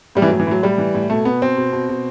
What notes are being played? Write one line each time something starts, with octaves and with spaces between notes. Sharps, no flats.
A2 G3
E3
A2 F#3
E3
A2 F#3
A2 G3
E3
A2
B2 A3
B2 B3
B2 C4
B2
B2
B2